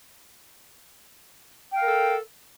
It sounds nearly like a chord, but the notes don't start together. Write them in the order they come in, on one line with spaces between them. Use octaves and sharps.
G5 F5 A#4 A4